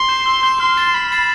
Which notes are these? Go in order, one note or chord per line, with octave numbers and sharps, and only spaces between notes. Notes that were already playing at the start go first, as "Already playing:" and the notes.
Already playing: C6
G6 C7 E7
E6
G6 C7 E7
C6 F6
A6 C7 E7
B5 F6
A6 C7 E7